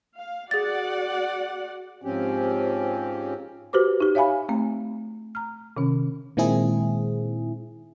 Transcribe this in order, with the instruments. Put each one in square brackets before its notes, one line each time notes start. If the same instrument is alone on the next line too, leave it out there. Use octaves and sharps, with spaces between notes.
[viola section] F5
[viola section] F#4 D5 F#5 [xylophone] G#4 A6
[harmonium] G#2 F3 C4 C#4 G4
[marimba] F#4 G4 B4 C5 D6
D#4 G4
C#5 E5 F5 G#5 B5
A3 C4
A#5 F6
C3 D#3 C#4
[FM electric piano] A#2 D#3 G#3 C4 E4 G#4